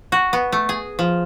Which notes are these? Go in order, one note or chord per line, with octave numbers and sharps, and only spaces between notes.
F#4
B3
A3
G#4
F3